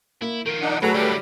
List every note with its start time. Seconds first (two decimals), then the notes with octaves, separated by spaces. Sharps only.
0.22 A#3 E4
0.46 D#3 F3 A#4
0.61 D4 D#4 F#5
0.82 B2 F#3 A3 G#4 A4 B4 A#5 B5
0.94 D3 F#3 G3 E4